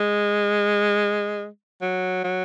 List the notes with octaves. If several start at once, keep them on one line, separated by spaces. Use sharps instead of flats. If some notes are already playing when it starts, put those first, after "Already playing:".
Already playing: G#3
F#3
F#3